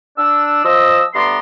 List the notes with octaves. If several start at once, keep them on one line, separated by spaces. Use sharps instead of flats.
D4 E6
F3 D#5 E6
G2 A3 B3 D5 A#5 C6